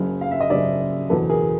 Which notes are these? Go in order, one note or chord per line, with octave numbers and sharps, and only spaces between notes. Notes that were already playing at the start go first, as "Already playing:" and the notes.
Already playing: F#1 F#2 C#3
F5
E5
D#5
F#1 F#2 C#3 D5 E5
F#1 E2 B2 A4 B4
G#4 A#4